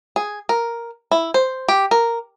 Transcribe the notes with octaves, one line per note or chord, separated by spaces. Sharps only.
G#4
A#4
E4
C5
G4
A#4